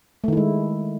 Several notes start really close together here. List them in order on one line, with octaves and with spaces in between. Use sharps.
A3 D#3 E4 G#3